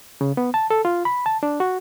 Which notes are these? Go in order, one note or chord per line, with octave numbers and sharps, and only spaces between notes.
C#3
B3
A5
A4
F4
B5
A5
D4
F#4